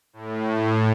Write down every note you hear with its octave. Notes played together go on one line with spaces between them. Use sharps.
A2